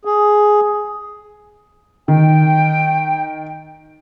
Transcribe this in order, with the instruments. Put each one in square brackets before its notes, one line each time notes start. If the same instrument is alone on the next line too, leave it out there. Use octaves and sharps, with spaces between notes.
[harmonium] G#4
[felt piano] D#3 [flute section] G5